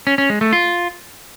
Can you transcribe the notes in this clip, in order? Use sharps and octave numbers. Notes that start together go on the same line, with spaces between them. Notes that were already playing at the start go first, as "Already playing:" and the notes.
C#4
C#4
G#3
A3
F4